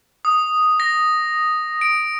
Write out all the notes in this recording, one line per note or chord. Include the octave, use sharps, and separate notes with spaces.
D#6
A#6
D7